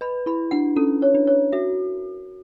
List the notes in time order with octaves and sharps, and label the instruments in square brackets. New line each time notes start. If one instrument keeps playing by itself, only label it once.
[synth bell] B4 [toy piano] B5
[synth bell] E4 [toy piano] B5
[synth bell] D4 [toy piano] F#5
[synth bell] C#4 [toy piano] A4
[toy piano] C#5
[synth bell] D4
[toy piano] C#5
[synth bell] F#4 [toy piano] E5